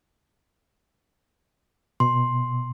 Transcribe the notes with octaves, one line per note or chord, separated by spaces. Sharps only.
B2 C6